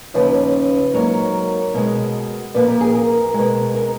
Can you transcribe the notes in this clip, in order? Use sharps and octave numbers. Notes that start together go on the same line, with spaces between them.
D#2 C#3 F3 B4
G#2 F#3 A#3 A#4
B2 G#3
A#2 F3 A#3 B4
A#4
G#4
A#4
B2 G#3
A#4